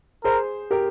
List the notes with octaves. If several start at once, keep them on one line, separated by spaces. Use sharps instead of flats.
G#4 A#4 C5
G4 A#4